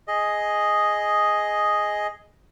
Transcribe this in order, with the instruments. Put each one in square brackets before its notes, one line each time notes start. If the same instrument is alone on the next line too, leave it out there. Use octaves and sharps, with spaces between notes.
[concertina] G#4 D#5